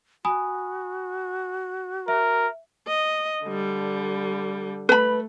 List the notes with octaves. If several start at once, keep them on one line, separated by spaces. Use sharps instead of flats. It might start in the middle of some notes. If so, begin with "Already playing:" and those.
F#4 G#5 B5 D#6
A#4 E5
D#5
D3 G3
A3 B4 B5